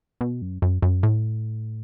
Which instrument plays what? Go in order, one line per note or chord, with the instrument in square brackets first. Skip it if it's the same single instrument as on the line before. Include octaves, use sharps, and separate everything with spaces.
[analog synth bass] B2
F#2
F#2
F#2
A2